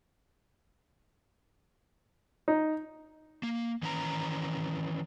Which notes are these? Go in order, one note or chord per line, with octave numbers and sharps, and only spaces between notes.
D#4
A#3
D#3 E3 C#4 B4 F#5 A#5